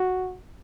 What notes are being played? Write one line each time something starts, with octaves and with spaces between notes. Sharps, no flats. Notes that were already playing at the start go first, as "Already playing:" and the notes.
Already playing: F#4